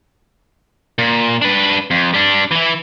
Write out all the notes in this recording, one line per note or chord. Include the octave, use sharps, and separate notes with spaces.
A#2
D4 B4
F2
G3 D4
E3 E4